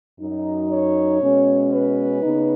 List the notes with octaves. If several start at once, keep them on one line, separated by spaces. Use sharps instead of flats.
F#2 F#3 D#4
C#5
B2 G#3 C#4
B4
C#3 B3 D#4